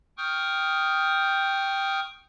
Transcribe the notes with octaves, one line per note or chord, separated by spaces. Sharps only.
G5 C#6 D#6 F6 G6